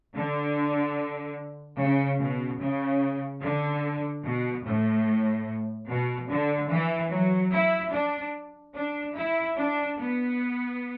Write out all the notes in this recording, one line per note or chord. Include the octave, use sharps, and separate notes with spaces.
D3
C#3
B2
C#3
D3
B2
A2
B2
D3
E3
F#3
E4
D4
D4
E4
D4
B3